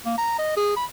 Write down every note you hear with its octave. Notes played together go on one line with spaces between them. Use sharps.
A#3
A#5
D#5
G#4
B5